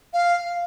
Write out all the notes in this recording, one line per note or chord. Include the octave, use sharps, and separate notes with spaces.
F5